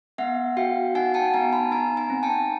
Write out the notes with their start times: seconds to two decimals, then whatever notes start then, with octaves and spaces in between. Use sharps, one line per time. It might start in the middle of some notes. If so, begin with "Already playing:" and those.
0.18 B3 E5 F#5
0.57 F#4 F5 G5
0.95 D#4 F#5 G#5
1.14 G5 A5
1.33 B3 G#5 A#5
1.53 A5 B5
1.72 D#4 G#5 A#5
1.97 G#5 A#5
2.10 C4
2.23 G5 A5